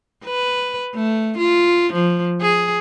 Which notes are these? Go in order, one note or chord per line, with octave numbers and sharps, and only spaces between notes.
B4
A3
F4
F3
G#4